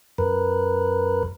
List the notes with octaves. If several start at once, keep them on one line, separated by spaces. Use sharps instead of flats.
F#2 A#4 B4